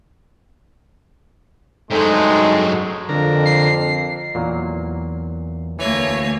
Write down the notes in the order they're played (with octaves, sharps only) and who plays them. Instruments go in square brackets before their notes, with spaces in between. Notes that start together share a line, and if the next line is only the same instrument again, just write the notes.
[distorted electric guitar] G2 F#3 [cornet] G#3 [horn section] A3 C4 D#4 [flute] A4
[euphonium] F2 [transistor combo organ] D3 A#4
[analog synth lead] C7
[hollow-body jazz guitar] E2 E3 [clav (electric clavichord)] A#2 F#3 A#3
[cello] D2 A#3 [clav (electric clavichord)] E3 [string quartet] A3 C#5 G#5